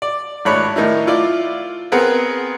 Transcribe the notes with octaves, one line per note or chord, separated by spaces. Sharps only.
D5
G#1 A2 D4 C#5 B5 F#6
A2 D#3 D#4 E4
E4 F4 D5
B3 C4 G#4 A#4 B4